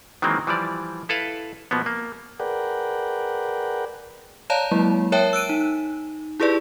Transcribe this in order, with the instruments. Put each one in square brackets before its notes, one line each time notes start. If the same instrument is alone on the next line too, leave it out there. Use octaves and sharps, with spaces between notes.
[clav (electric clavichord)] D#3 E3 F#3 G#3 A#3 C4
E3 F3 G3 D5
E4 A4 B4 F5
B2 F3 A#3 B3
A#3
[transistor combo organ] G#4 A#4 B4 D5 F#5 G5
[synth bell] C#5 D5 F5 A5 A#5
F#3 G#3 A#3 E4
A#4 C#5 E5 G5 A5
E6 F#6 D7 D#7
D#4
E4 G4 G#4 B4 D5